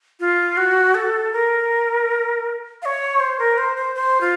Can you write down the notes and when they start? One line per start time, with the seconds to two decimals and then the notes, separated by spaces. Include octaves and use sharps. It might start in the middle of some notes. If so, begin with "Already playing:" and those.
0.20 F4
0.57 F#4
0.95 A4
1.33 A#4
2.82 F5
2.85 C#5
3.20 C5
3.39 A#4
3.58 C5
3.76 C5
3.95 C5
4.21 F4